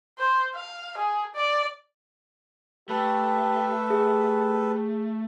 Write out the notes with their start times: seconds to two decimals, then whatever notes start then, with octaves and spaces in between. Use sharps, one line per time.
0.18 C5
0.55 F5
0.97 G#4
1.35 D5
2.89 A3 G4 A4 B4
3.90 G4 G#4